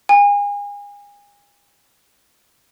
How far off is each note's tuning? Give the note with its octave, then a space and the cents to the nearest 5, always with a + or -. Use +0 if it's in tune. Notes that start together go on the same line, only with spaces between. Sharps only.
G#5 -35